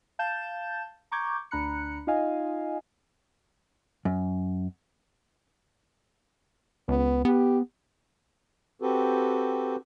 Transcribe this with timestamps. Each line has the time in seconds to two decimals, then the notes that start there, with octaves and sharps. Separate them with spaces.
0.19 F5 A5 G6 A6 E7
1.12 A#5 C#6 D6 G6 G#6
1.51 D2 D4 A#5 B5 F#6 C#7
2.07 D#4 F4 D#5 F5 G#5
4.05 F#2
6.88 C#2 B3
7.25 B3 G4
8.82 C4 F#4 G4 A4 B4